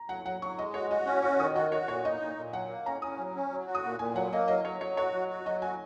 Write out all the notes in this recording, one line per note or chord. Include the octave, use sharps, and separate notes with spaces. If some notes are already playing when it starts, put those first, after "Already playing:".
Already playing: A#5
F#3 F#5
F#3 F#5
F#3 C#6
G#3 D#5
F#4 C#5
F#4 D#5
C#4 F#5
F#4 C#6
D#3 D#6
F#4 D#5
F#4 C#5
A#2 C#5
D#4 D#5
A#2
A#2
F#3 F#5
A#3
C#4 A#5
C#4 D#6
F#3
C#4
F#3
F#4
D#6
A#2
A#2 G#5
F#3 F#5
A#3 D#5
F#3 D#5
F#3 C#5
F#3 C#5
F#4 C#5
F#3
F#4
F#3 D#5
F#4 G#5